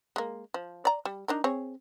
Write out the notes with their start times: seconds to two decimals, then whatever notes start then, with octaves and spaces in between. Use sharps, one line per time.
0.16 G#3 A#3
0.54 F3
0.85 D5 A#5
1.05 G3
1.28 D4 D#4 A#4
1.44 C4 G#4 C#5